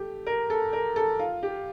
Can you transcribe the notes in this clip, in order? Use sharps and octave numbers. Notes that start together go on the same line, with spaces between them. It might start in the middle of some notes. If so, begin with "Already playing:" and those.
Already playing: A3 G4
A#4
A4
A#4
A4
F4
G4